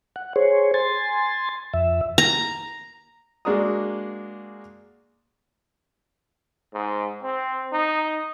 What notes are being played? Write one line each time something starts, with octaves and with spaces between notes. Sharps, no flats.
F#5
G#4 C5 C#5
G#5 C6 A6
F2 E5
A#5
G#3 A#3 D4 F#4 A#5 D#6
G#2
C4
D#4